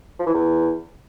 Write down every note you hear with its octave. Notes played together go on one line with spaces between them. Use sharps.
F3
E3
E2